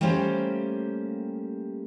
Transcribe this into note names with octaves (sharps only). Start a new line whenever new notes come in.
G3 A3 A#3 C#4 G4 C5